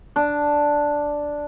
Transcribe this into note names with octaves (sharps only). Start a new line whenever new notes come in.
D4